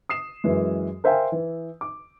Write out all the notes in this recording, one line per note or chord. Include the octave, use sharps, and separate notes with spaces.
D#6 C7 E7
F#2 E3 G#3
A#4 C5 E5 F5 G5 G#5
E3
D6